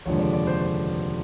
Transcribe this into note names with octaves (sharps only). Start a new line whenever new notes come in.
F1 D#2 D3 F3 G#3 C#5
D5
D5
C5
C5